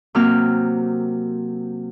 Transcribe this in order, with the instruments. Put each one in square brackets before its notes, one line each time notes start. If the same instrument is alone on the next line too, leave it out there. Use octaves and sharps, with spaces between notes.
[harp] C3 F#3 A#3 C4 F6